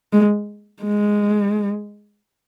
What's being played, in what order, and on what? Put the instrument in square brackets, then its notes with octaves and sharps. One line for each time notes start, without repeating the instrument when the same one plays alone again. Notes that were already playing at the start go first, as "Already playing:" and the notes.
[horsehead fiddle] G#3
G#3